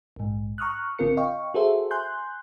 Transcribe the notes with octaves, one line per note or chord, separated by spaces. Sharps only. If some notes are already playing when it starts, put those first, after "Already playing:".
A#1 G#2
A#5 C#6 D#6 F6 F#6
A1 D3 C4 F4 A#4 C#7
D#5 F5 G5 C#6
F#4 G#4 A4 C5 E5
G#5 C6 F#6 G6